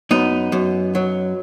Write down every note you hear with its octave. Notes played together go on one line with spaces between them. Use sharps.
F#2 B3 D#4
F#2
F#3